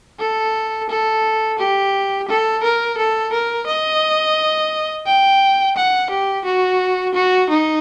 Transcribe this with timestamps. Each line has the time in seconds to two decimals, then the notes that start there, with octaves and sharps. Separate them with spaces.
0.20 A4
0.89 A4
1.59 G4
2.28 A4
2.63 A#4
2.98 A4
3.32 A#4
3.67 D#5
5.06 G5
5.76 F#5
6.10 G4
6.45 F#4
7.14 F#4
7.50 D#4